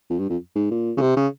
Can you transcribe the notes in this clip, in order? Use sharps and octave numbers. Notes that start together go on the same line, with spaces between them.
F2
G2
F2
G#2
A#2
C#3
C3
C#3